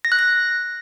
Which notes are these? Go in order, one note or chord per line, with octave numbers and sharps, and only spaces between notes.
A#6
F#6
A#6